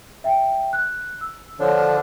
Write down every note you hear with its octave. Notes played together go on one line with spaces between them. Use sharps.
E5 G5
F#6
E6
D3 F3 D4 C#5
F6